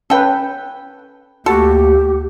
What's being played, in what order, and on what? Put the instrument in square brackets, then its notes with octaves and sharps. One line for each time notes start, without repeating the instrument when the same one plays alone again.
[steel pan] C#4 B4 [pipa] A4 G5
[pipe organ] D2 A3 A#3 [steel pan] F#4 [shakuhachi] G4 [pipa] A4